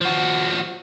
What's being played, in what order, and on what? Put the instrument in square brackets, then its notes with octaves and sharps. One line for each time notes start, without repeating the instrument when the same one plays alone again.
[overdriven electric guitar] F3 F#4